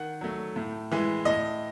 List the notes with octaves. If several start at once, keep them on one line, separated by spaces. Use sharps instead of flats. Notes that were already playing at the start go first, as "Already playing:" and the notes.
Already playing: D#3 F#5
F#3 A3
A2
E3 G#3
A2 D#5